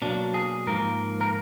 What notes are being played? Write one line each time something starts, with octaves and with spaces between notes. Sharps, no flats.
B2 F#3 A#3 D4
G#4
G#2 F3 A#3 A#4
A#4